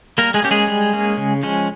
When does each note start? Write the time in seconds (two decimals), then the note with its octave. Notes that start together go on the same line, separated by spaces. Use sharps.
0.18 G3 A#3 A#4
0.34 G#3 G#4
0.42 A#3 C#4 G4
0.51 G#3 G#4
0.67 G3
0.93 A#3 C#4
1.17 C#3
1.43 F3 G#3 C#4